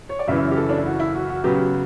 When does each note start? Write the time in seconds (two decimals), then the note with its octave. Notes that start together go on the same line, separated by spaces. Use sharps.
0.09 C#5
0.19 D5
0.28 F#2 C#3 E3 E5
0.51 G4
0.57 A4
0.69 D4
0.78 E4
0.86 F#4
1.00 E4
1.14 F#4
1.29 F#4
1.44 C#3 F#3 B3 G4